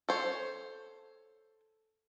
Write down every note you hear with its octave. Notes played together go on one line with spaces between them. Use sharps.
A4 C5 C#5